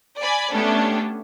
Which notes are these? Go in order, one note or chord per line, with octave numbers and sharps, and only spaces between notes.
D5 G#5 B5
A3 B3 C#4 D4 G4 A4